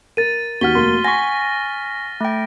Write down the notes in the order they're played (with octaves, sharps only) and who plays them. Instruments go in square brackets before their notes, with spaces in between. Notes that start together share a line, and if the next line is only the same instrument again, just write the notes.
[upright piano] A#4 [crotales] A6 D#7
[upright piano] D#2 F#5 [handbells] F#4 [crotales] F6 B6 G7
[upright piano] F1 A#3 [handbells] C6
[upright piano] F#5 B6 [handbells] G#5 C#6 [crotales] A#6
[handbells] A3 G5